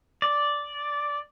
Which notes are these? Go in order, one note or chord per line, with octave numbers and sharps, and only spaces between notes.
D5